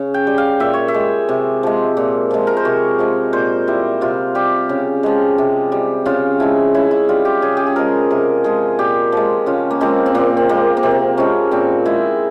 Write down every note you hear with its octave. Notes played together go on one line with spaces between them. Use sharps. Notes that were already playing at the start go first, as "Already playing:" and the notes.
Already playing: C#3
G5
G3
F5
A#2 E5
C#5
E5
G#3
C3
F3 G#3
A#2
F3 G#3
A#4
C5
C3 C#5
F3 G#3
A#2 C5
G3 E4
C3 F4
G3 G4
C#3
F3 G#3
C3
G3
C#3 F4
F3 G#3 E4
C#3 E4
E4
G3 F4
G4
C#3 G#4
G4
G#4
F3 G#3 A#4
C3 A#4
F3 G#3 G#4
A#2 G4
F3 G#3
C#3 F4
A#3
F3 G#3 C4
C4
A#2 A#3
C4
G#3 A#3
A#3
C3 C4
F3 G#3 C#4
A#2 C4
G#3 E4